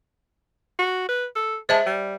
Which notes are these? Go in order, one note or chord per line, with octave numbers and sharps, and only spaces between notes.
F#4
B4
A4
G#3 C5 E5 A5
G3